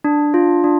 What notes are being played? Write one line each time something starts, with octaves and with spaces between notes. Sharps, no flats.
D4
F4
D4